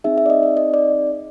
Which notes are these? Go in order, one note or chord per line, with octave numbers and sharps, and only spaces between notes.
C4 D#4 G#4 E5
E5
D5
D#5
D5
D#5
D5